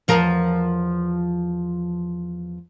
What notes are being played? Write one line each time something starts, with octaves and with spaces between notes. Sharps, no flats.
E2 F3 A#4